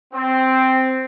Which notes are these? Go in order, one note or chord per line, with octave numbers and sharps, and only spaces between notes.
C4